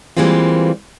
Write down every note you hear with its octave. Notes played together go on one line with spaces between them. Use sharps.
E3 G3 G#3 A#3 C4 F4